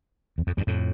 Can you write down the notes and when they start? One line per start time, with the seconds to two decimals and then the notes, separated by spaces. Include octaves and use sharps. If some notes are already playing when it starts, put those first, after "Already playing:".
0.38 E2
0.47 F2
0.57 E2 G2
0.67 F2 A2